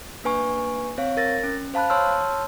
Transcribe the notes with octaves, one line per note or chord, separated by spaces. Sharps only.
A#3 D4 B4 G#5 C#6
C4 C#5 F5
A#4 A6 A#6
C#4
C5 F5 A5 B5 F#6
C#5 A5 C6 E6 F6